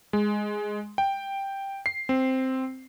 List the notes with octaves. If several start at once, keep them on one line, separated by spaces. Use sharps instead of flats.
G#3
G5
C7
C4